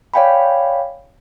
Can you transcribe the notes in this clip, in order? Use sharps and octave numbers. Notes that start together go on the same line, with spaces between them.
C#5 D5 F5 G5 G#5 B5